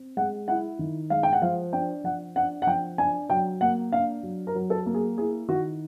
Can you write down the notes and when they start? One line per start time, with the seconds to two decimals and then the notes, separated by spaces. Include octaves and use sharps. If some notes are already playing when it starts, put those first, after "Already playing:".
Already playing: C4
0.17 G#3 F#5
0.48 E4 F#5
0.79 D#3
1.10 G#3 F5
1.23 G5
1.33 F#5
1.42 F3 F5
1.73 D4 G5
2.04 F3 F#5
2.36 D4 F#5
2.62 F#5
2.67 F3 G5
2.98 D4 G#5
3.30 F#3 G5
3.61 A#3 F#5
3.92 D4 F5
4.23 F#3
4.47 A#4
4.55 F#3
4.70 A4
4.86 A#3
4.94 G#4
5.18 E4 G#4
5.48 D#3 F#4